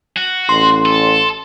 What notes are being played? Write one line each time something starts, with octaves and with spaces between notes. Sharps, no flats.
F#4
A1 C6
A4